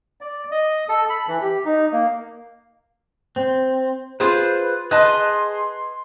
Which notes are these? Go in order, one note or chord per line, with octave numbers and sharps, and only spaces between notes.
D5
D#5
A4
B5
E3
G4
D#4
A#3
C4
F4 G#4 B4 C5
G#4 B4 D#5 A5 C6 D#6 F#6